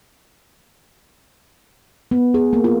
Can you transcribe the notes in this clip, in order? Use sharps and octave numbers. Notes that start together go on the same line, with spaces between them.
B3
G#4
A#3
F4